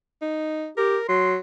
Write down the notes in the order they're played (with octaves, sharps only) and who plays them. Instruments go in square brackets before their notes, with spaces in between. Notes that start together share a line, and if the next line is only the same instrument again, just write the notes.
[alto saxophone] D#4
[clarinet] G4 [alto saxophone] A#4
[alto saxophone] F#3 [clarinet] C6